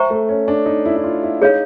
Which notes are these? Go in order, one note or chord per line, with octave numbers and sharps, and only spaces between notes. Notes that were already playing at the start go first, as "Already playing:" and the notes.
Already playing: C5 E5 G5 A#5 C#6
A3
C#4
D4
D#4
E4
E4
F4
E4
D#4 G#4 C#5 F5